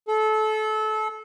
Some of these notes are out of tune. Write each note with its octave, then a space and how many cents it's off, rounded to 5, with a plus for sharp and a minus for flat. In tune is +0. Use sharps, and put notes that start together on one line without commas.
A4 -25